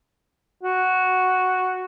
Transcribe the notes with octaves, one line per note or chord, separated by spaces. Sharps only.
F#4